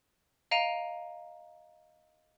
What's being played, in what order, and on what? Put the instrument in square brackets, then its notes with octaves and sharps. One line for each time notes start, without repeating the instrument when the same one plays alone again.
[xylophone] D#5 F5 A#5 D7 D#7 F7